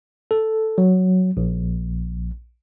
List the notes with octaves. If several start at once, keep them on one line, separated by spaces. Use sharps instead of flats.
A4
F#3
A#1